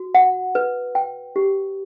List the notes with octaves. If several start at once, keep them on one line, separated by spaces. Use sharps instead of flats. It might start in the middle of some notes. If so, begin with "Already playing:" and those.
Already playing: F#4
F#5
B4
G5
G4